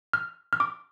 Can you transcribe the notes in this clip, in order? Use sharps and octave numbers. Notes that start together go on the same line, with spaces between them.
F6
F6
D6